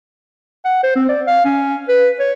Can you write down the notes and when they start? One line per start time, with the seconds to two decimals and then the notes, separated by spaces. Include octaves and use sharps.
0.65 F#5
0.83 C5
0.96 C4
1.09 D5
1.27 F5
1.45 C#4
1.88 B4
2.20 C#5